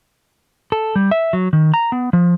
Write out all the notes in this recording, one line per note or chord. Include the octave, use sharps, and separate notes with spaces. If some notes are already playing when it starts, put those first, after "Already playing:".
A4
G3
E5
F#3
D#3
A#5
B3
F3